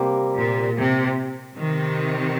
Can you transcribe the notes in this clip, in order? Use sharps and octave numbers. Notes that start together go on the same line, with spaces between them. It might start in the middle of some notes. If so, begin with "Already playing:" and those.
Already playing: C3 G3 A#3
A#2
C3
C3 D#3